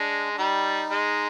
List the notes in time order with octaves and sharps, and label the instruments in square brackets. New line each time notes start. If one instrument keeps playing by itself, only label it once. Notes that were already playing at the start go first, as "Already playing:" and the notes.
Already playing: [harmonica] G#3 [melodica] D4
[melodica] D4
[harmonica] G3 [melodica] D#4
[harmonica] G#3